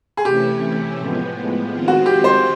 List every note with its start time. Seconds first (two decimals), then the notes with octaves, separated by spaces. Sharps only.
0.17 G#4
0.25 C3 E3 A3 C#4 E4 G4
0.98 A2 F3 G#3 B3
1.70 D#3 G#3 C4 F4
1.88 F#4
2.06 G4
2.24 C5